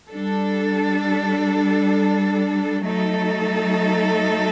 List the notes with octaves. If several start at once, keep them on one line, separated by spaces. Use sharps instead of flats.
G3 D4 A4
F#3 A3 D#4 A4